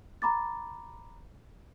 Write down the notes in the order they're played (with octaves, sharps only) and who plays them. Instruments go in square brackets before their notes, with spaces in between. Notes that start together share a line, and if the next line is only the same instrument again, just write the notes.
[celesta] A#5 B5 D6 A6